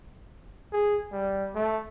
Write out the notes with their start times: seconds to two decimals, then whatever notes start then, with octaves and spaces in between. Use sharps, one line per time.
0.72 G#4
1.12 G3
1.55 A3